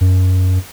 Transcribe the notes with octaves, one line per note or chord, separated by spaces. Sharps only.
F#2